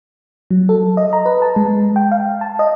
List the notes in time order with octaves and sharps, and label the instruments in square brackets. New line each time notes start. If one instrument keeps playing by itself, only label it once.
[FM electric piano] F#3
A4
D#5
A#5
B4
A5
G#3
G5
F5
A5
D#5